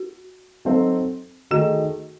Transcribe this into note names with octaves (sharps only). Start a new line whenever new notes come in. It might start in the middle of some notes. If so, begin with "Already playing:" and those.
Already playing: F#4
F#3 C4 D#4 A4 C5
D#3 A3 D#4 F#4 G#4